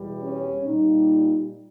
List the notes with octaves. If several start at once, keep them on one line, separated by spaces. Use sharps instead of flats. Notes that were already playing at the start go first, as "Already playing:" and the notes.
Already playing: E2 B2 G3
C#4
A#2 G3 D#4